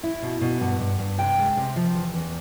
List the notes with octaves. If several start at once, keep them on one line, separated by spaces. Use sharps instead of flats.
E4
B2
B2
G2 F#5
G2
G2
C3 G5
G#3
C3
F3
E2
E2